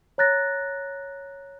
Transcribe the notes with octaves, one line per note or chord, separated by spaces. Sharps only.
C#5 A#5 F#6 A6 A#6